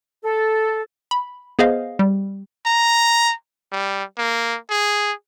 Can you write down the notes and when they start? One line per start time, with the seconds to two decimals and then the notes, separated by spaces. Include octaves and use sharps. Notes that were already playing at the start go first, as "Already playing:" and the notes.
0.24 A4
1.11 B5
1.59 B3 G#4 C5 D#5 F5
1.99 G3
2.66 A#5
3.72 G3
4.18 A#3
4.70 G#4